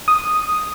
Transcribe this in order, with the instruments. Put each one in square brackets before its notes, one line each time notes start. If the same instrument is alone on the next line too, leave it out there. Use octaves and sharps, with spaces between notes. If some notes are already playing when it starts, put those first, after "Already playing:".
[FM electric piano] D#6